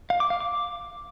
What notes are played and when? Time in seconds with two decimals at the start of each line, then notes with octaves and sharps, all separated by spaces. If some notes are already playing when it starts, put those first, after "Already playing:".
0.10 F5
0.20 D6
0.30 F5
0.40 D6